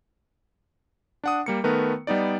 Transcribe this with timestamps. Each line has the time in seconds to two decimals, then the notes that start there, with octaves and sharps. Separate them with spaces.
1.24 D4 F#5 D#6
1.46 G3 A#3 C#7
1.64 D#3 A3 B3 A#4 B4
2.07 G3 B3 D#4 D5